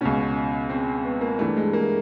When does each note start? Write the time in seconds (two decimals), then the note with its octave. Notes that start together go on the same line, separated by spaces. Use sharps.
0.01 C#2 B2 C#4
0.70 C4
1.05 B3
1.21 A#3
1.39 G2 E3 A3
1.57 G#3
1.73 A#3